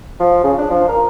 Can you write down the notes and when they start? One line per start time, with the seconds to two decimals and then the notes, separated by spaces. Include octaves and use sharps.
0.20 F3
0.44 C#3
0.58 D4
0.70 F3
0.88 A#4